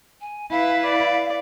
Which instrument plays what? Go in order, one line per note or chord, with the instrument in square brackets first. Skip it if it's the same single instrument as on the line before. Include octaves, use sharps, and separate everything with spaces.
[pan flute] G#5
[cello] E4 B4 [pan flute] F5
[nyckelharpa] D5